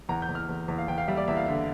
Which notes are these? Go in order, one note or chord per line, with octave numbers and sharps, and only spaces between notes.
E2 A#5
G6
E2
F6
E2
E2
F5
E2 G5
F5
G3 E5
D5
E2 E5
F5
D3 E5